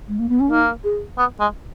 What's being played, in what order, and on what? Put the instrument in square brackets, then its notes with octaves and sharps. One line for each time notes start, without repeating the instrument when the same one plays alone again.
[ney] G#3
A#3
B3
C#4
[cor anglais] A#3 [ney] D#4
[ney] G#4
[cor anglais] B3
G#3